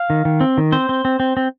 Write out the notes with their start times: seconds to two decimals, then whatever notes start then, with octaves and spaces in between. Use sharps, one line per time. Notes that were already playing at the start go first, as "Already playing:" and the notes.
Already playing: F5
0.10 D#3
0.25 D#3
0.41 C4
0.58 D#3
0.72 C4 C5
0.89 C4
1.05 C4
1.20 C4
1.37 C4